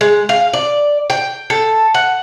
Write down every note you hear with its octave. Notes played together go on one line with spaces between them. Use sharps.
G#3
F5
D5
G5
A4
F#5